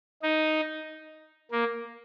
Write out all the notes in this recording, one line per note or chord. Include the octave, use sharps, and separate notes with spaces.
D#4
A#3